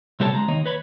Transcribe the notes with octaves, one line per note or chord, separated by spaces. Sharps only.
C3 G3 G4 A4 C#5 A5
C#2 G#3 A#5
D#2 D#3 A#3 C#5 D#5
B4 C#5 B5